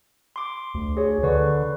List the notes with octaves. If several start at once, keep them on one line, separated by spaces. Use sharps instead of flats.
C6 D6
D2
G#4 C#5
D3 B4 D5 C#6